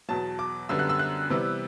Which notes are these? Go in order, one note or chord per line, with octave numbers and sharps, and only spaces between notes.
E2 B2 F#3 A5
D6
F#2 D3 G3 B3 E6
F#6
E6
F#6
C3 E3 G3 B3